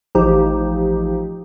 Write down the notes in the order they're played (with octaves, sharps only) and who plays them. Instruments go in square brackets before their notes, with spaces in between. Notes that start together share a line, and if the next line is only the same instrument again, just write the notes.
[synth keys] A1 F3 D#4 G4